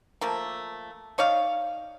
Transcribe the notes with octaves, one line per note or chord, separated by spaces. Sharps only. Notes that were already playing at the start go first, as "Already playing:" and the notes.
F3 A3 A#3
D#4 C#5 D5 F5